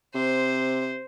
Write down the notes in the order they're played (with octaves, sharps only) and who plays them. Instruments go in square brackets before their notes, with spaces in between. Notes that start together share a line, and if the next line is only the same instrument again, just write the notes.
[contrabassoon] C3 [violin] C5